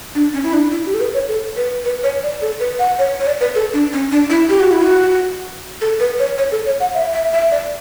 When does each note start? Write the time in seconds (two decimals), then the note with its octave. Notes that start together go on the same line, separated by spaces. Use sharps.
0.15 D4
0.34 C#4
0.44 E4
0.53 D4
0.72 E4
0.86 G4
0.94 A4
1.01 B4
1.14 C#5
1.28 A4
1.57 B4
1.85 B4
2.03 C#5
2.23 D5
2.42 A4
2.60 B4
2.79 F#5
2.99 C#5
3.20 C#5
3.27 D5
3.41 B4
3.55 A4
3.73 D4
3.93 C#4
4.12 D4
4.30 E4
4.49 G4
4.60 F#4
4.71 E4
4.82 F#4
5.81 A4
6.00 B4
6.19 C#5
6.38 C#5
6.52 A4
6.66 C#5
6.80 F#5
6.94 E5
7.13 E5
7.32 E5
7.51 D5